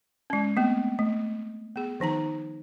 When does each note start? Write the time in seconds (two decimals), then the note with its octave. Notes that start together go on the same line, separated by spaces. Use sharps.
0.30 G#3 C#4
0.57 A3 B3 C4
0.99 A3
1.76 B3 G#4
2.00 D#3 F3 D#4 A#5